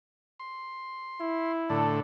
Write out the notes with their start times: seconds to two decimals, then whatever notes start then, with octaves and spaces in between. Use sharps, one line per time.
0.40 C6
1.20 E4
1.70 A2 D3 D4 A4